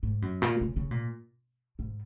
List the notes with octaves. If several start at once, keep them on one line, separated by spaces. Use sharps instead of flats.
G#2
F#2
A#2
C#3
C#3
A#2
G#2